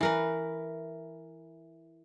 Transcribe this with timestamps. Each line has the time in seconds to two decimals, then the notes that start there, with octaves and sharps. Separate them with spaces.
0.01 E3 A#4 B4